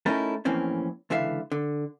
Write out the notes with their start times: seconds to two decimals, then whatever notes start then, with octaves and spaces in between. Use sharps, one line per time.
0.06 A3 C#4 D#4 E4 A4 A#4
0.45 F2 A2 E3 A#3 C4 C#4
1.10 C#2 D3 E3 E5 F5
1.52 D3